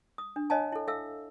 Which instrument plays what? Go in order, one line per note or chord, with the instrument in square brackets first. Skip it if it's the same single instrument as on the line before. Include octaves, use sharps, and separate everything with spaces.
[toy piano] D#6
D4
C#5 D#5 F5 G#5 A5
E4 A4
A4 E5 F5 E6